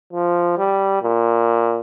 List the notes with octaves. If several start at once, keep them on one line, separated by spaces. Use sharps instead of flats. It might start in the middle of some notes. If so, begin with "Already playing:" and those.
F3
G3
A#2